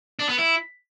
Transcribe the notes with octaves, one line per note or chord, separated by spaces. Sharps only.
D4
B3
E4